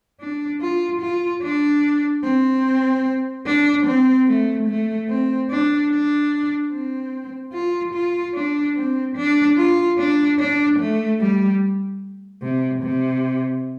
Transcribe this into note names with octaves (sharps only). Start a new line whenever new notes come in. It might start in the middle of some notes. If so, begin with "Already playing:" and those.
D4
F4
F4
D4
C4
D4
C4
A3
A3
C4
D4
D4
C4
F4
F4
D4
C4
D4
F4
D4
D4
A3
G3
C3
C3